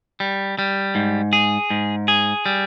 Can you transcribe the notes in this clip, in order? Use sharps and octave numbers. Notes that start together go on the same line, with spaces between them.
G3
G3
G#2
G#4
G#2
G#4
G3